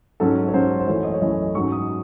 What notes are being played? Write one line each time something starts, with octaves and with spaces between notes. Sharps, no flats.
G#2 F#3 C#4 A4
C#5
G#2 F#3 C#4 C5
C5
F#2 E3 A3 C#5
D#5
C#5
F#2 E3 A3 D#5
G#2 F#3 C#4 C#6
D#6